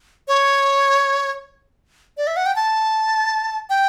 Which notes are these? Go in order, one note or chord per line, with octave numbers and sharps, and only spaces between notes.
C#5
D5
E5
F#5
G5
A5
G5